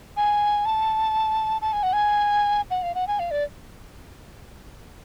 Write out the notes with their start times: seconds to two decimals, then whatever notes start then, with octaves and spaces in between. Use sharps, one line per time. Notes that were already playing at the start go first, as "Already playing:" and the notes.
0.17 G#5
0.65 A5
1.62 A5
1.73 G#5
1.83 F#5
1.93 G#5
2.71 F#5
2.83 F5
2.95 F#5
3.07 G#5
3.19 F5
3.31 D5